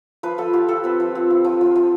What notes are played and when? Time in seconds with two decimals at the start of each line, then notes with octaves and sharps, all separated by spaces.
0.23 F3 B4
0.38 F3 A4
0.53 F4 G4
0.68 F3 A4
0.84 C4 B4
1.00 F3
1.15 C4
1.31 F4
1.45 F3
1.61 F3
1.76 F3